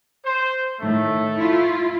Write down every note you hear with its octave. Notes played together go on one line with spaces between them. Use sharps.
C5
A2 D#3 A3
E4 F4